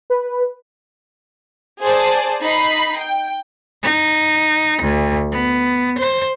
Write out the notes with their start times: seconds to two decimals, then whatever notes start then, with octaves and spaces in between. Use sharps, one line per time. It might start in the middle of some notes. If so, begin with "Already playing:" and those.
0.10 B4
1.82 G#4 C5 D5 A5
2.42 D#4 B5 C7
2.98 G5
3.83 D#4
4.82 D2
5.32 B3
5.98 C5